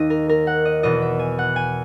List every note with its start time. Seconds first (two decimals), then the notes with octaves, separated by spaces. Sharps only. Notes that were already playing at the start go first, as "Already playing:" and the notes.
Already playing: D#2 D#3 D#5
0.10 A#4
0.29 A#4
0.47 F#5
0.65 D#5
0.83 E2 B2 D#5
1.02 E5
1.19 G#5
1.39 F#5
1.56 G#5